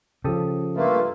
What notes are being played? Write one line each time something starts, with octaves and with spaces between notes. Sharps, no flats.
C#3 F3 G4 A4 D#6
G2 A3 A#3 F4 B4